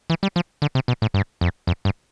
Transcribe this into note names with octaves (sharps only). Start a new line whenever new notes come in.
E3
G3
F3
D3
C3
B2
A2
G2
F2
F2
G2